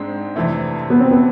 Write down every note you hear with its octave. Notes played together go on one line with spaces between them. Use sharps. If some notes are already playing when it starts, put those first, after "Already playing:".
Already playing: G#2 G#3 C4 D4
F2 C3 E3 A3
B3
C4
B3